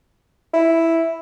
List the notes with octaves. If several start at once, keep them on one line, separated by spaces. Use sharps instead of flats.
E4